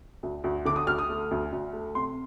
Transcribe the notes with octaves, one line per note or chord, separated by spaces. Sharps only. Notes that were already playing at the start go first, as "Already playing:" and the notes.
D2
D2
D3 D6
D#6
D2 F6
D#6
A3
D2
D2
A3
C3 C6